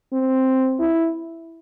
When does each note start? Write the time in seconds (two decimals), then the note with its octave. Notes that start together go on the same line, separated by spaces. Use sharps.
0.13 C4
0.80 E4